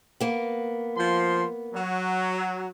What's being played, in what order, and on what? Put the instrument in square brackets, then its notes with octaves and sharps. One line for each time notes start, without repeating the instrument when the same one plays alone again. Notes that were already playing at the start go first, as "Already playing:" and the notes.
[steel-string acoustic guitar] A#3 B3
[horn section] F3 C6
F#3